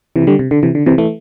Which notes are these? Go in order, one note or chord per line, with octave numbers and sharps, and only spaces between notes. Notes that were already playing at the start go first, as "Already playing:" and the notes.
C3 E3
D3 G3
C3
D3
C3 E3
D3
C3 E3
E3 A3